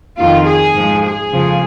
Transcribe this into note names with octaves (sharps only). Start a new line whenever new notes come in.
F2 D#3 F4
G#4
G#2 F3
G#4
F2 C#3 F3